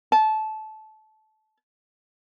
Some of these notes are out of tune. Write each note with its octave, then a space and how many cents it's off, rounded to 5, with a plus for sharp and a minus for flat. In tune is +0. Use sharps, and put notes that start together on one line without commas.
A5 -20